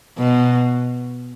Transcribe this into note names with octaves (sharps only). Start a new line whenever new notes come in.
B2